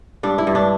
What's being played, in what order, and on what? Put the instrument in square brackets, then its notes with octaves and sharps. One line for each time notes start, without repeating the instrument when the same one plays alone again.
[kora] G2 D4
E4
G2
D4